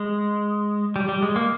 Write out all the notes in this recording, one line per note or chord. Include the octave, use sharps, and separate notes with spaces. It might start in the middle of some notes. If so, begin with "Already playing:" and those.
Already playing: G#3
G3
G3
G#3
A#3